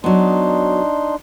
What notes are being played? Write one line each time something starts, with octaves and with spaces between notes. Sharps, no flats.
F#3 B3 D4 D#4 C6